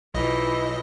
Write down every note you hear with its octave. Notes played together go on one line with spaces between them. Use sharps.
B1 E3 F3 D#5